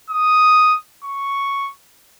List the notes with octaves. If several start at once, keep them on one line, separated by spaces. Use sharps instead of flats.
D#6
C#6